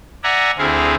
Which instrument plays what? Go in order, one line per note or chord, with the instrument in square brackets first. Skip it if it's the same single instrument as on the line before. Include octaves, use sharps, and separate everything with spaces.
[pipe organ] D5 E5 F#5 G#5 A#5
D2 C4 E4 G#4 F5